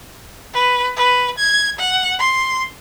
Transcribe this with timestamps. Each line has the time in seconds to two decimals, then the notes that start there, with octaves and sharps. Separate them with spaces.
0.54 B4
0.97 B4
1.39 G#6
1.79 F#5
2.19 C6